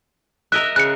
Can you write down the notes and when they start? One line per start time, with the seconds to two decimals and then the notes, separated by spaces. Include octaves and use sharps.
0.52 A#4 D#5 E5 F#6
0.76 C#3 F#6 C#7